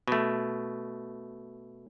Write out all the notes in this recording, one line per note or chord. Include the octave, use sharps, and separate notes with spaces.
B2 A3